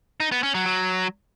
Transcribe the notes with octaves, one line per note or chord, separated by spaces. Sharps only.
D#4
B3
C#4
F#3
F#3